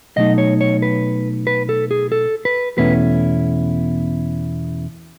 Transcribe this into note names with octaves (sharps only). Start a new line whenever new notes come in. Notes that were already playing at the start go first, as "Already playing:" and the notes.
B2 F#3 A3 D#4 D#5
C#5
C#5
B4
B4
A4
G#4
A4
B4
E2 B2 A3 C#4 E4 B4